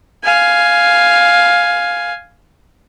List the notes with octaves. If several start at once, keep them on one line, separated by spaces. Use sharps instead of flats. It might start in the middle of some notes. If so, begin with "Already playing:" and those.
F5 G#5